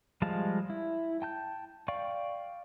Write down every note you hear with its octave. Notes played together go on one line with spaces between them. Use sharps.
F3 G3 G#3 F5 A5
E4
G5 A5 G6
D5 F5 G5 C#6